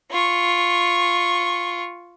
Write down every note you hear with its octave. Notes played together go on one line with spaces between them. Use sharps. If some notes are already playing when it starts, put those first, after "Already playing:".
F4 C#6